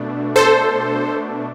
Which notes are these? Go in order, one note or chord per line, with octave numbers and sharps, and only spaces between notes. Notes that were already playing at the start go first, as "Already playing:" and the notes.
Already playing: B2 A3 D4
A4 C5